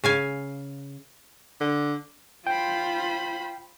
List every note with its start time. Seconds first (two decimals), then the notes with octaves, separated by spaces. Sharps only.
0.04 C#3 F5 G#5
1.60 D3
2.47 F4 C5 G5 B5